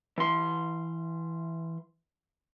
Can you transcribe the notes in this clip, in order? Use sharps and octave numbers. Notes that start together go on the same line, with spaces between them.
E3 C6